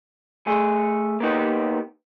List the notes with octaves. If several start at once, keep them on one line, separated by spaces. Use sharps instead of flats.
A3 G#4
A#3 B3 D#4 G4